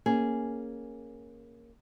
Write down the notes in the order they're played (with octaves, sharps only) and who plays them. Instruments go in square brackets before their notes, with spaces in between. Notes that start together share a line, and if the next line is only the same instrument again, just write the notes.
[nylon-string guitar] A#3 C#4 G#4